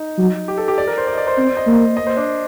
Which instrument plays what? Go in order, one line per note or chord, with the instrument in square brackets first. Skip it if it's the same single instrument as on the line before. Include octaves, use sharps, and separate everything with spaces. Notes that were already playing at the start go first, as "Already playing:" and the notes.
Already playing: [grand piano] D#4
[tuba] F#3
[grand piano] G4
A4
G4
D5
A#4
C5
D5
D#5
D5
C5
[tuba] C4 [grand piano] C5
[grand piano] D5
D#5
[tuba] A#3
[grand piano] D#5
C5
D4